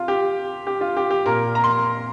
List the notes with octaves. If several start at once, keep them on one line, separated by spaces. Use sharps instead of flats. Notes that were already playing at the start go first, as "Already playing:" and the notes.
Already playing: C3 F4
G4
G4
F4
G4
G4
A#2 A#3 A#4
A#5
C6